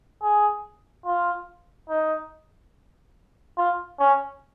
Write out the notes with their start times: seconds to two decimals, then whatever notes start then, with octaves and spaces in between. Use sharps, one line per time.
0.22 G#4
1.06 F4
1.89 D#4
3.57 F4
4.00 C#4